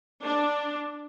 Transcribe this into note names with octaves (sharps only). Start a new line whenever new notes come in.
D4